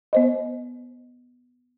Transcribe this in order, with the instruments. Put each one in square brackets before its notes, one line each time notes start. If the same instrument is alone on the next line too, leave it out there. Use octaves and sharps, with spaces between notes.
[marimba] B3 C5 D#5